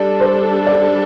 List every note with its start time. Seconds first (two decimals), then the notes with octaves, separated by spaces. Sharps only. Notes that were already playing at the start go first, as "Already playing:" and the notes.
Already playing: G3 D4 A4 D5
0.20 C5
0.67 D5